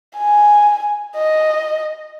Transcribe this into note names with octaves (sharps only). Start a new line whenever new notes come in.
G#5
D#5